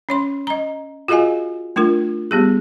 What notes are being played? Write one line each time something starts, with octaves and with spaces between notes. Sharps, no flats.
C#4 C#5 C6
D#5 A#5
F4 F#4 G#4 D#5 F5 G#5
A3 D4 F4 A#4
G3 B3 G4 G#4